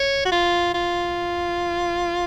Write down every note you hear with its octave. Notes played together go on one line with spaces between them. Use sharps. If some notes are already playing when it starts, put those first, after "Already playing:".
Already playing: C#5
F#4
F4
F4